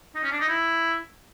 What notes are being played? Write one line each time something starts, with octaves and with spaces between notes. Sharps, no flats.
D#4
C#4
D4
D#4
E4